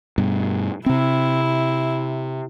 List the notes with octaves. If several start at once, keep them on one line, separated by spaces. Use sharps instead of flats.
G2 B2
C3 C4 E4